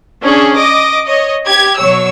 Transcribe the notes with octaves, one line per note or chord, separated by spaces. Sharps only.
C#4 D4 G#4
D#5 D6
C#5 D#5
G4 G#6
B2 F#3 C#5 E6